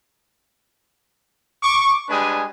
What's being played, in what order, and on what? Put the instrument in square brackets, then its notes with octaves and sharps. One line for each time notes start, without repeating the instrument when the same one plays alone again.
[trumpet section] C#6 D6
G3 G#3 D4 B4 G#5 D#6